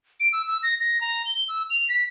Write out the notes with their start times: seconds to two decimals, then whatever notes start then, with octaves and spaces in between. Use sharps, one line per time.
0.20 D7
0.33 E6
0.48 E6
0.63 A#6
0.80 A#6
1.01 A#5
1.26 G7
1.48 E6
1.70 F7
1.89 B6